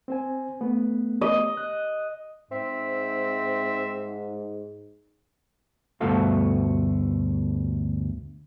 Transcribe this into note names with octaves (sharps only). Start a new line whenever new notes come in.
C4 C5 G#5
A3 B3
D#5
F#6
G#2 C4 E5
D2 G2 B2 A3 F#4 F5